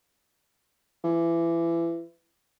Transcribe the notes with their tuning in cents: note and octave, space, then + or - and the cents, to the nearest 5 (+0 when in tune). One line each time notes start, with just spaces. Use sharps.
E3 +25